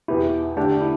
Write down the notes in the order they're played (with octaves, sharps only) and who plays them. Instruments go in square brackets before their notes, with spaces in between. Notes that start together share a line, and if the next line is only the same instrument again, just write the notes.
[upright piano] E2 B2 B3 G4 [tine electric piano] E4
[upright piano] D3 A3 G4 [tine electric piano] D4
[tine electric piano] E4